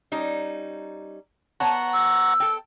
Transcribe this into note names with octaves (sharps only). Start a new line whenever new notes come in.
G3 C#4 D#4
B3 C#5 F#5 A5 A#5 C#6
E6
A4 G5